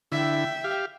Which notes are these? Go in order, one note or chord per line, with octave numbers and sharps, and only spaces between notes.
D3 E4 E5 G5
G4 F5